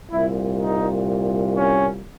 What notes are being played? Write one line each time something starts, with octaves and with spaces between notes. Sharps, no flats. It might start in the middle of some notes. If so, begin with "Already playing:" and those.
C2 A#2 G3 E4
D#4
C#4